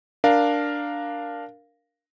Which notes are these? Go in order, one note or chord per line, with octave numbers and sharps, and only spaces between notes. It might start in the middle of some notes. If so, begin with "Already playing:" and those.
D4 A#4 F5